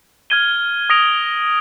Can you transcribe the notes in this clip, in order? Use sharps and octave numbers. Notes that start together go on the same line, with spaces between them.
F6 G#6 D#7 G7
D#6 A#6 D7 F7